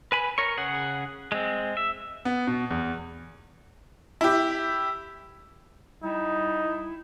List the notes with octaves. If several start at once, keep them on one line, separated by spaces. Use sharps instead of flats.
B4 G#5 B5
A#4 C#5 C#6
C#3 G#4 F#5
G#3 C4
E5
B3
B2
E2
E4 G4
G3 D#4 E4